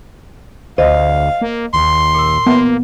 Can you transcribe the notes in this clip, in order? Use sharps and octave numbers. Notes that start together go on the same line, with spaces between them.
D2 C5 D#5 F5
A#3
D#2 C6
A#2 E6
A#3 B3